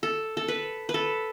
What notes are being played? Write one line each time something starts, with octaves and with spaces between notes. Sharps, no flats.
A4
A4
B4
B4
A4